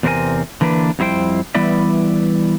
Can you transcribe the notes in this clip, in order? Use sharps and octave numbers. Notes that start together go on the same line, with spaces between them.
E2 C3 C4 E4 A#4 G#5
D3 E3 A#3 D4 B4
F2 G3 E4 C5 G5
E3 G3 B3 E4 D5 E5